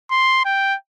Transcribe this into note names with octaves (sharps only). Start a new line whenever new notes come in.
C6
G5